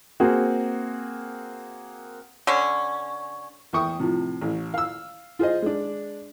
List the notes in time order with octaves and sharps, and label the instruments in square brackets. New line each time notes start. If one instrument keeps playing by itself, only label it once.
[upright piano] A#3 C4 F#4 G#4
[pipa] D3 C#4
[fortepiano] E2 E5 G5 C#6 D#6
A2 C3 F3
A1
F5 E6
F4 G#4 C5 D#5
G#3 D4